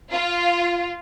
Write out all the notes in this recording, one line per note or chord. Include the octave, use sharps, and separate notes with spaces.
F4